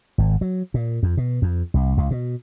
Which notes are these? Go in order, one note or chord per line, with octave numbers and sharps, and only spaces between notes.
G#1
F#3
A#2
F2
B2
F2
C2
C#2
B2